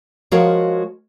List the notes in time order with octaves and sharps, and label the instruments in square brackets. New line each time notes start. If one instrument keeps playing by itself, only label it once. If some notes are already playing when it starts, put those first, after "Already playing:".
[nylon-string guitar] F3 G#3 F#4 A#4 C#5 F5